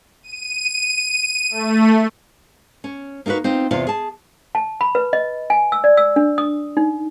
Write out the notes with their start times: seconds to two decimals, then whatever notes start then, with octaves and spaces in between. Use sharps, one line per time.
0.23 D#7
1.50 A3
2.84 C#4
3.26 A#3 D#4 F4 F#4 B4
3.44 C4 D#4 F4
3.71 E2 C3 F4 F5
3.87 G#4 A5
4.55 A5
4.81 B5
4.95 B4
5.13 D#5
5.50 G#5
5.72 E6
5.84 D5
5.97 E6
6.16 D4
6.38 D#6
6.77 D#4